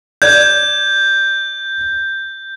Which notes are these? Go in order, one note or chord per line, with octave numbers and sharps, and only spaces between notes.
D5 G6 G#6